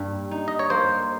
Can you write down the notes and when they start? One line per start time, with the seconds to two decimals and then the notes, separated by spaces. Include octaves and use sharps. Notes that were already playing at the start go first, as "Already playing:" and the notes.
Already playing: G2 G3 A#3
0.31 D#4
0.48 D#5
0.59 C#5
0.70 A#3 C5